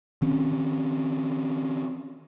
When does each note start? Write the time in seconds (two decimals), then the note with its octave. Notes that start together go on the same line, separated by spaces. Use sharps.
0.22 D#3 C4 C#4